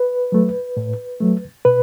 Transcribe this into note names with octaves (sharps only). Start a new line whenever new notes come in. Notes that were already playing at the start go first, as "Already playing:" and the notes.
Already playing: B4
F#3 A3
A2
F#3 A3
B2 B4